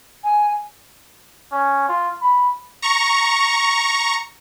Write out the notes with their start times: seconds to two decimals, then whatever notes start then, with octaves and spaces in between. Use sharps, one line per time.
0.23 G#5
1.52 C#4
1.89 F4
2.21 B5
2.82 A#5 C#6